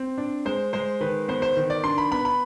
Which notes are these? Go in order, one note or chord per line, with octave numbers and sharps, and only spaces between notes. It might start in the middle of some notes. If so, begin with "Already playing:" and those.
Already playing: C4
D4
G#3 C5
G#3 C5
D#3 B4
B3 C5
C5
D#3
D5
D4 C6
B5
B3 B5
B5